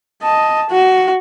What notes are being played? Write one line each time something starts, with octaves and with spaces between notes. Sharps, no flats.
D#5 A5
F#4